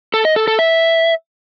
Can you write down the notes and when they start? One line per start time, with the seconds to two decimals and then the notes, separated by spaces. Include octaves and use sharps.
0.14 A4
0.25 D#5
0.36 A4
0.48 A4
0.59 E5